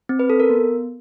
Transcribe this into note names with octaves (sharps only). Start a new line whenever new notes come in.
C4
B4
A4
A#4
B3